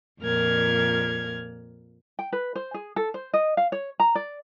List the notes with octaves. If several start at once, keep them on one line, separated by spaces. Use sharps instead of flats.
F2 A#2 A#4 F6 G#6
G5
B4
C5
G#4
A4
C5
D#5
F5
C#5
A#5
D5